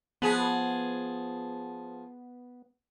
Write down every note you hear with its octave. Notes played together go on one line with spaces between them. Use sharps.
F3 B3 G#4